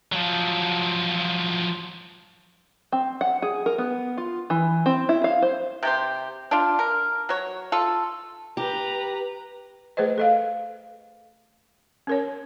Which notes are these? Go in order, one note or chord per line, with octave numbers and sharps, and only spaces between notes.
F3 F#3
C4
F#5
G#4
A#4
B3
F4
E3
C4
E4
F5
C5
C3 G4 C5
D4 F4
A#4
F#3 C#5
F4 A4
G4 B4 A#5
A3 G#4 B4 C5 D#5
A4 D#5 F5
C#4 A#4 C#5